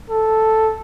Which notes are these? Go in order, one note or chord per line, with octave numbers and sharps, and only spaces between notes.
A4